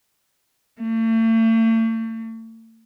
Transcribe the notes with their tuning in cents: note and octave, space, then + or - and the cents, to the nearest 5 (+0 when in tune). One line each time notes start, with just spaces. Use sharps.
A3 +40